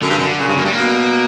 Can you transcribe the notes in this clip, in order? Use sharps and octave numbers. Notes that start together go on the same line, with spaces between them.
F#2 D3
G2
F#2
D3
A#2 C#3
G2
F#2 A#3
G2 G3
B2 A#3